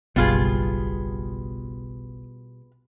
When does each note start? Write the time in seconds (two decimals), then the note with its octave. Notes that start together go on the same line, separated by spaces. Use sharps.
0.16 F#1 B1 B2 G3 B3 F4 G#4